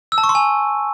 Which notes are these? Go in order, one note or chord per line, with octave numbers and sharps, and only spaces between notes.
E6
A5
C#6
C6
G#5